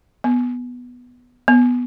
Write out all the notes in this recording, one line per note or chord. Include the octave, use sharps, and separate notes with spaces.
B3
B3